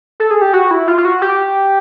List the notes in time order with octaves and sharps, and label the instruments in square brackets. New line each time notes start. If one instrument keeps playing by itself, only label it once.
[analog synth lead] A4
G#4
G4
F#4
E4
F4
F4
F#4
G4